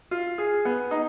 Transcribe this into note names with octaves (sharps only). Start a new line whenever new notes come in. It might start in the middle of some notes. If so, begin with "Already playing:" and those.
F4
G#4
B3
D#4